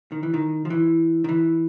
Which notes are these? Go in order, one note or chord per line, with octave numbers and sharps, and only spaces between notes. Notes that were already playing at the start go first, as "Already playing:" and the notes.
D#3
E3
D#3
F3
E3
D#3
E3